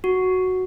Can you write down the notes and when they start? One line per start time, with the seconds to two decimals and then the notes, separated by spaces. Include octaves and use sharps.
0.04 F#4